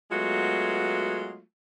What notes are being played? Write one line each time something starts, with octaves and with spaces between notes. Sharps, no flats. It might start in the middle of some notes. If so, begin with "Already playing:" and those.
F#3 G#3 A3 B3 F4 F#4